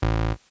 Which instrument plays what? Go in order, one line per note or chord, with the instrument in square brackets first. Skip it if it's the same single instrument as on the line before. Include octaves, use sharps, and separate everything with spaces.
[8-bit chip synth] A1